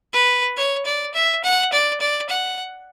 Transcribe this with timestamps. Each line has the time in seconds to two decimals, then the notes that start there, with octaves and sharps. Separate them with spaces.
0.13 B4
0.57 C#5
0.85 D5
1.14 E5
1.44 F#5
1.72 D5
2.00 D5
2.29 F#5